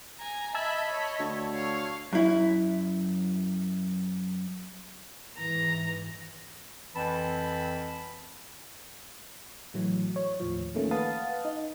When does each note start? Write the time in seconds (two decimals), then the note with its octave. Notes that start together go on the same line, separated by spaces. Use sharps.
0.20 G#5 A#5
0.55 D#5 E5 A5 B5 E6 G#6
0.89 C#5
1.19 D2
1.53 C#5 F5
2.13 F#2 E4
5.38 G#2 E3 A#5
6.95 F2 E3 C4 A5 B5
9.74 A2 E3 F#3
10.16 C#5
10.40 D#2 A2 F3
10.75 D#3 F3 A3 A#3 C#4
10.91 B4 F5 F#5 A5 D#6 A6
11.45 D#4